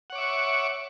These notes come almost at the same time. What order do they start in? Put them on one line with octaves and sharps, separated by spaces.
F#5 C#5 D6 E5 C#6